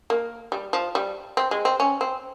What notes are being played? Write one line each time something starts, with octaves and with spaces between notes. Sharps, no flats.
A#3
G3
F3
G3
C4
G#3
C4
C#4
C4